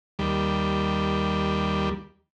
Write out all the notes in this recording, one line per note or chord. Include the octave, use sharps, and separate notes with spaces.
D#2 G3